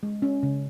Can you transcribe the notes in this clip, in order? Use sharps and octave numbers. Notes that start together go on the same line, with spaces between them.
G#3
C#4
C#3